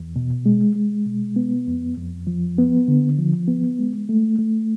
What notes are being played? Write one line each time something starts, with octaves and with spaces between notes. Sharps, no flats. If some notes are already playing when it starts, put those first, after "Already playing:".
Already playing: E2
B2
G#3
G#3
B2
B3
F2
F2
F3
B3
D3
F3
B3
G#3
A3
A3